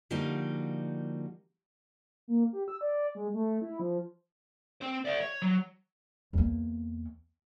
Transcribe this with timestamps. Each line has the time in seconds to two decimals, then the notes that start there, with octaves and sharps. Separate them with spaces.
0.11 D3 F3 G3 A#3 D#4 F#4
2.28 A#3
2.53 G4
2.68 E6
2.81 D5
3.15 G#3
3.34 A3
3.62 E4
3.79 F3
4.81 C4 C5
5.05 D5 E5
5.20 C#5
5.42 F#3
6.33 E2 A#3